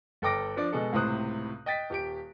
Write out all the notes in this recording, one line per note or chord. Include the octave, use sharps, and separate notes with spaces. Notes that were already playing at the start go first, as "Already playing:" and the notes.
G1 A4 G5 D6 A#6 D7
F3 D4 D5
B2 G#3 A4
C#2 A2 C3 C5 D#6 F#6
D#5 G5 A6 B6
D#1 G4 D7